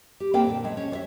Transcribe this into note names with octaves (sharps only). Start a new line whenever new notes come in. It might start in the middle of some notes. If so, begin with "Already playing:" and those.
G4
A#3 C4 A4 B4 F5 G5
A#2 D3
G#3 A3
C#4
C#5 E5